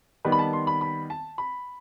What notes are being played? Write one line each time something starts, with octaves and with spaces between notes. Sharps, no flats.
D#3 G3 B3 B4
B5
A5
C6
B5
B5
A5
B5